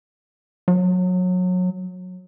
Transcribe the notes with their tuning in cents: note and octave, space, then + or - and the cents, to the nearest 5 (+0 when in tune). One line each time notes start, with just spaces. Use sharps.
F#3 -25